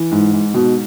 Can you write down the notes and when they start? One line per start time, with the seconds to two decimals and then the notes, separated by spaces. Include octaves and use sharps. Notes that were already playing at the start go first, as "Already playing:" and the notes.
Already playing: E3
0.11 G#2
0.33 G#2
0.54 B2